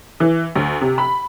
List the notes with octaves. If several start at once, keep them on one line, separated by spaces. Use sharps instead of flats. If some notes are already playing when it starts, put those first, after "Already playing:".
E3
D2
C3
B5